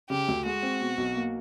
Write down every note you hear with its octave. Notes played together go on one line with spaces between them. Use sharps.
C#3 G4
D2
G#3 F#4
C4
B2
B1
A#3